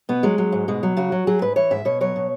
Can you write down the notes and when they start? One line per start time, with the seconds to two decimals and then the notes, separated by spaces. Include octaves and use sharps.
0.09 B2 B3
0.23 F#3 G#3
0.38 F#3
0.52 G#2
0.68 B2 G#3
0.83 F#3
0.97 C#3 F#4
1.12 F#3
1.27 F#3 G#4
1.42 G#2 B4
1.56 E3 C#5
1.71 G#2 E5
1.85 B2 C#5
2.01 F#3 C#5
2.16 B2